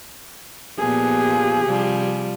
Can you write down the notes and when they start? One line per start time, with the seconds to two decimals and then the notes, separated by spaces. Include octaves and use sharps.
0.79 A#2 F3 B3 G4 G#4
1.64 C3 F3 G3